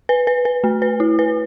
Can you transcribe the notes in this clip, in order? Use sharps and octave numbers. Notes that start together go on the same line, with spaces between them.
B4
B4
B4
A3
B4
E4
B4